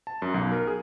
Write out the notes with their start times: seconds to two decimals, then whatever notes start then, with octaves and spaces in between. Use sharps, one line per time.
0.07 A5
0.22 F#2
0.34 B1
0.52 A#4
0.67 G#4